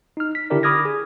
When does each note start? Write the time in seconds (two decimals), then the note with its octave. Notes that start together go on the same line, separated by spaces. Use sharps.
0.17 D#4 F6
0.35 B6
0.50 D3 D4 E4 G4 A#4 D5
0.63 B5 D6 D#6 F6 G#6 A#6
0.85 G#4